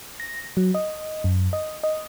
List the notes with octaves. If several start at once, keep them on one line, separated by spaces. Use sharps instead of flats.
A#6
F#3
D#5
F#2
D#5
D#5